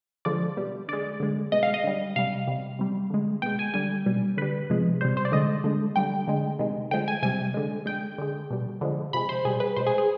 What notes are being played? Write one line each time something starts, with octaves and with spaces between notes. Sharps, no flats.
D3 F3 G#3 D5
B2 G3
D3 G#3 D5
D3 G#3
B2 G#3 D#5
F5
D#5
D3 G3
C3 G3 F5
C3 G3
C3 G3
D3 G#3
B2 G#3 G5
G#5
D3 G3 G#5
B2 G3
D3 G3 B4
C3 F3 G#3
C3 G3 C5
C5
D5
D3 G#3 D#5
D3 G#3
D3 G3 G5
D3 G#3
C3 D#3 G#3
D3 F3 G#3 G5
G#5
C3 G3 G#5
D3 G#3
D3 G#3 G5
D3 G#3
B2 G3
D3 F3 G#3
C3 F3 G#3 B5
C5
B2 G3 G#4
B4
B2 G#3 C5
G#4
G#4